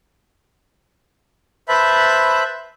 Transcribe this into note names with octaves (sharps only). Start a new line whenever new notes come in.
B4 C5 E5 A5 B5